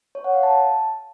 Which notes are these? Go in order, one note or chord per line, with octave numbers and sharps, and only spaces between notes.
C#5
F#5
F5
A5